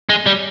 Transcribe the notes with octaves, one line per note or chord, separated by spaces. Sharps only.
G#3
G3